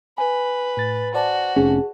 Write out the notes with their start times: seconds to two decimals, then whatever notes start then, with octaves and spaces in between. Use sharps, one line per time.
0.18 B4 G#5
0.77 A2 A6
1.14 F#4 C5 D5 A5
1.56 F1 C#4 G#4